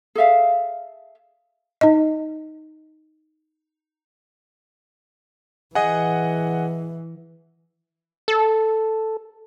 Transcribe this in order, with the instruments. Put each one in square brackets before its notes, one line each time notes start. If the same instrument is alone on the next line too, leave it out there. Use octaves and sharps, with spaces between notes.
[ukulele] G#4 A4 E5 F5
[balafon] D#4 D#5
[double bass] E3 [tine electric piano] G#4 G#5 [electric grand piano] D#5 F#5
[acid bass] A4